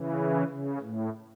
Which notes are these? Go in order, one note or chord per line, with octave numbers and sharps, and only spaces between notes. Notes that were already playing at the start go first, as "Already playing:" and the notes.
Already playing: C#3 E3
C#3
A2